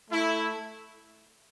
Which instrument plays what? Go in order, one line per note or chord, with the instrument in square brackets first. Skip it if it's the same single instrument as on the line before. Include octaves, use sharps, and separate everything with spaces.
[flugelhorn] A3 [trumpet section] E4